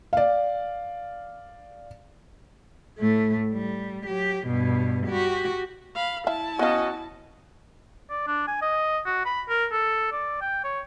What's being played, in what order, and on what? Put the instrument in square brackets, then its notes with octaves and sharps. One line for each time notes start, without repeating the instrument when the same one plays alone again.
[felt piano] D5 F5
[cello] A2 A3
G3
F#3 G4
G2 B2
F#4 G4
[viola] F5 B5
[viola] E4 A5 [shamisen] E5 F5
[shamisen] B3 F5 [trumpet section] C#4 F#4 D#5
[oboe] D5
D4
G#5
D#5
F#4
B5
A#4
A4
D5
G5
C#5